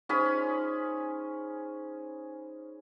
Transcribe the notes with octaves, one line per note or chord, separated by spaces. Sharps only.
C#4 D#4 G#4 C5 B5